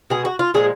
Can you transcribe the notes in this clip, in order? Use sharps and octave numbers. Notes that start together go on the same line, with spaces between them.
B2 G#3 G#4
F#4
F4
A#2 F3 G#3 G#4